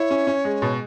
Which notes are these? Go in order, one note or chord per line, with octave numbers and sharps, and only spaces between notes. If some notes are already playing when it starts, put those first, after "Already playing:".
Already playing: E4 C#5
C#4
C#4
G#3
B2